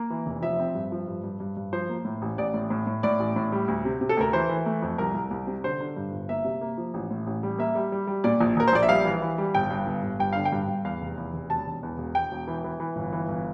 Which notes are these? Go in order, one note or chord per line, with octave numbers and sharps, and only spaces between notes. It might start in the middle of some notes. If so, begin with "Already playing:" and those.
Already playing: A#3
E3
F1
F3 E5
C4
G2
F3
G2
G2
G2
G2
F3 C5
A#3
A2
A1
A1 D5
A2
A2
A2
A2 D5
A1
A2
G3
D2
C3
C3
A4
D2 A#4
E3 C5
E3
A3
F2
C2 A#4
C2
C2
C3
D3 C5
D3
G2
G1
A#3 E5
C3
A#3
F3
A1
A2
A1
G3
A#3 E5
G3
G3
G3
A#2 D5
A#1
A#1 A#4
C5
A#1 D5
E5
G3 F5
E3
E3
G3
G1 G5
G2
G1
G1
G2 G5
D3 F5
G5
G2
G2
E2 F5
F1
E2
F1
E1 A5
E1
E2
E1
E1 G5
E1
E3
E3
E3
G1
E3
G1